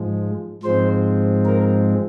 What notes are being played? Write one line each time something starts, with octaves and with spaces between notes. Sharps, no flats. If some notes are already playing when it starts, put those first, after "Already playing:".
Already playing: G#2 F3 G#3
G#2 F3 G#3 C4 C5
A#4